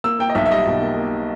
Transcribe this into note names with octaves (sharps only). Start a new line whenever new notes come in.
A#3 E6
A#3 G5
D#5
B1 E5
E5
G3 D#5
B2
A#3
A#3